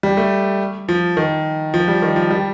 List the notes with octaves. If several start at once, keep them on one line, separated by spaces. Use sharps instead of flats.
G3
A3
F3
D#3
F3
G3
D#3
F3
G3